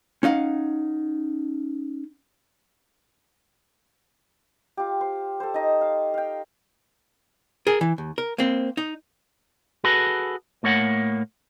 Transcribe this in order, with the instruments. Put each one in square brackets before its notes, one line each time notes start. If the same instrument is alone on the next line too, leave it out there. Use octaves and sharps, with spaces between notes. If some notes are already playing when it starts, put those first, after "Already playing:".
[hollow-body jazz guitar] C#4 D#4 F5 F#5
[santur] F4 G4
C5
A4 C5
D#4 D#5
F5
F5 G5
[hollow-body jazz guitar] G#4 A#4
E3
D#2
A#4
A#3 C4
D#4
[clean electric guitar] F#4 G#4 A4 B4
A2 A3 A#3 C#5 F#5